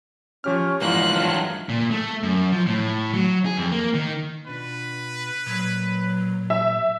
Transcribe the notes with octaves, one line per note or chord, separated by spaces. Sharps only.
F3 C#4 G4 F6
E2 G#2 E3 F3 A#3 D#4 F4 F#6
G2 F#3 A3
A#2
A3
F#2
F3
A2
F#3
G#4
F2
A#3
D#3
B2 D4 F4 B4
A#2 F#3
E5